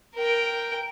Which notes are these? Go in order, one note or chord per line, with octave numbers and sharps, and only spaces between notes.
A#4 G5